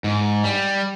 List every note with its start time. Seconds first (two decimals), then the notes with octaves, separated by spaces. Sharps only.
0.04 G#2
0.44 G3